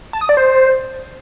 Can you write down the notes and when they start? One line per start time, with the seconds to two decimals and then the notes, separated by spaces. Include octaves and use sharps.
0.13 A5
0.21 D#6
0.29 D5
0.37 C5